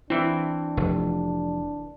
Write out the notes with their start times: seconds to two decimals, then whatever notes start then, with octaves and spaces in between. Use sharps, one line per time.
0.10 E3 C4 D4 E4
0.77 F1